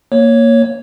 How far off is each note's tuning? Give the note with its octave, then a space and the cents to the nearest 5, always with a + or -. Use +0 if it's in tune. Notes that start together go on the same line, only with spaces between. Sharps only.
A#3 +0 C#5 +0